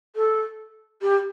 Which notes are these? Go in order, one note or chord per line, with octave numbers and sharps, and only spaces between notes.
A4
G4